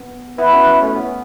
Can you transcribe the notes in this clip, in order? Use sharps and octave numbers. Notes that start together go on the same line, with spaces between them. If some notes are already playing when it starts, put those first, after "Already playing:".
Already playing: B3
B3 E4 B4 E5 B5
C#4 F#4
A3 C#4
B3